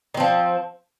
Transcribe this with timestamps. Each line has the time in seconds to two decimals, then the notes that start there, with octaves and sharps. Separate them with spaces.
0.14 D#3
0.17 C4
0.20 F3